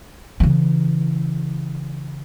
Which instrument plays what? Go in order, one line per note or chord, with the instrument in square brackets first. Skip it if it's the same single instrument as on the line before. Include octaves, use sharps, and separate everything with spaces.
[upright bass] C#3 E3